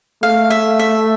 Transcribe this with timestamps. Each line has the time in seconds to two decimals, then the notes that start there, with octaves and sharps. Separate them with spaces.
0.23 A3 F5
0.50 E5
0.79 E5